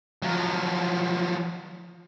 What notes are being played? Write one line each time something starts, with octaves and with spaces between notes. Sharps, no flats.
F3 F#3